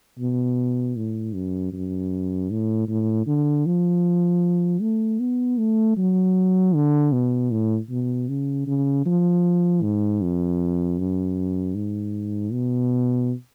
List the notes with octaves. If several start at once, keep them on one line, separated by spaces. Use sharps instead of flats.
B2
A2
F#2
F#2
A2
A2
D3
F3
A3
B3
A3
F#3
D3
B2
A2
B2
C#3
C#3
F3
G#2
F2
F#2
G#2
B2